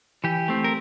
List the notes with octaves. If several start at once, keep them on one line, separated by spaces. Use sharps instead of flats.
E3 G4
A3 C4
A#4